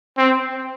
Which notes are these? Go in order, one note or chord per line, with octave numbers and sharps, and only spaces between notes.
C4